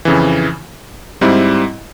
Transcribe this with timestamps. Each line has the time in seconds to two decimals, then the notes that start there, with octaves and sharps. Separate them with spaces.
0.05 F2 C#3 E3
1.21 G#2 G3 C4 E4